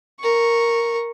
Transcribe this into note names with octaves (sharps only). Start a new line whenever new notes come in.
A#4 C#6